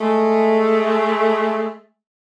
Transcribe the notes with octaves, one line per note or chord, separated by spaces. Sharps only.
G#3 A3